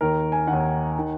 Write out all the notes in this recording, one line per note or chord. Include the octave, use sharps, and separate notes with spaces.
D#2 D#3 A#4
G#5
D#3 F#5
D#2
D#3